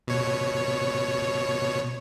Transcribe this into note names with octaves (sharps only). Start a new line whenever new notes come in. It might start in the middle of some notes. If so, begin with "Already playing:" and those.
B2 C#5